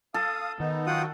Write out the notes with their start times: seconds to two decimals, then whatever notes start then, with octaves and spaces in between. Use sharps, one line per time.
0.14 A4 F5 D#6
0.60 D#3 B3 D#4
0.86 F#3 F4 F#4 F#5 G5 D#6